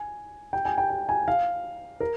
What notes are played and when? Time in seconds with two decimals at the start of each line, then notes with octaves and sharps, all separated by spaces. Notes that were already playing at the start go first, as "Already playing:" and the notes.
Already playing: G#5
0.53 G5
0.65 G#5
0.78 G5
0.90 G5
1.09 G#5
1.28 F5
2.00 A#4